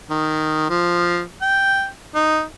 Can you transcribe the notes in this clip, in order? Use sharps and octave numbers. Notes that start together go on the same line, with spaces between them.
D#3
F3
G5
D#4